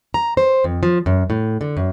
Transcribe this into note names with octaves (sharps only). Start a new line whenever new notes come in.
A#5
C5
F2
F3
F#2
A2
D3
F#2